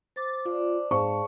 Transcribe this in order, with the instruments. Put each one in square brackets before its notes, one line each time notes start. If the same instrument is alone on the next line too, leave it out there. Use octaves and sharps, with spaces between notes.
[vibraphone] C5 D6 [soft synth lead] A6
[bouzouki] D4 [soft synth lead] F4
[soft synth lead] G#2 [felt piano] G#4 C5 C#6 [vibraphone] F5 A5